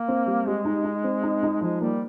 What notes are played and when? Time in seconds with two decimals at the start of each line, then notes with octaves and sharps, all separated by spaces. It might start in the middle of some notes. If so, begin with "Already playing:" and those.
Already playing: A#3
0.08 C4
0.26 G3
0.47 G#3 G4
0.65 D#4
0.84 D#4
1.04 C4
1.23 D#4
1.43 D#4
1.61 F3 G#3
1.81 G3 A#3